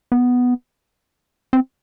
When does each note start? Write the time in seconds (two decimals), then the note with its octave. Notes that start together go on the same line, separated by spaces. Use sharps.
0.12 B3
1.53 C4